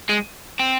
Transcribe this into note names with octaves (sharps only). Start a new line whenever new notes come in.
G#3
C4